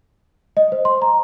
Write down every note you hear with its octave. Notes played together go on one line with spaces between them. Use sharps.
D#5
C5
C6
A#5